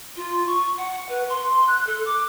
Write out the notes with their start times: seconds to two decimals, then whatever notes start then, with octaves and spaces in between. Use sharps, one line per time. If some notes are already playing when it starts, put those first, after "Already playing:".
0.16 F4
0.47 C#6
0.77 F#5
1.09 B4
1.29 C6
1.67 F#6
1.87 A4
2.05 D6